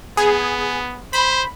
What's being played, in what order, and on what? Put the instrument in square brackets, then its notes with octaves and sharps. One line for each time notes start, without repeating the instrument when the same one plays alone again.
[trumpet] B3 [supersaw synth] G#4
[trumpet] C5 [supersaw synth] B5